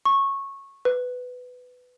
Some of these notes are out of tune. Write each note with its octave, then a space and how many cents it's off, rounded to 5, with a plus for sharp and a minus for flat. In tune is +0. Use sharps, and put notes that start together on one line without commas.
C#6 -15
B4 +15